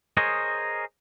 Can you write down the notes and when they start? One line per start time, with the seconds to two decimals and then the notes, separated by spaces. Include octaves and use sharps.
0.17 G#4 A#4 C5 C#5 D#5